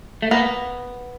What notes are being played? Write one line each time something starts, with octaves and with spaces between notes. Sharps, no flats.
A3
A#3 B3